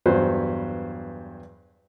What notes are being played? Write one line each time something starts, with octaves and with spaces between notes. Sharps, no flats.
E2 G2 F#3 B4 C5